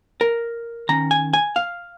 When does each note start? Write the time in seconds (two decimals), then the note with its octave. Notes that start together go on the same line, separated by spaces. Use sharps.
0.21 A#4
0.89 D#3 C#4 A#5
1.11 G#5
1.33 G#5
1.56 F5